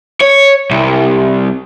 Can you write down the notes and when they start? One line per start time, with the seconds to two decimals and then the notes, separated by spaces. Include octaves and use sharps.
0.21 C#5
0.71 C2